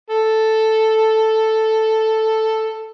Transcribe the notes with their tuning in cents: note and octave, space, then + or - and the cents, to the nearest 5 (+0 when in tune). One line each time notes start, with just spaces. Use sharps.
A4 +0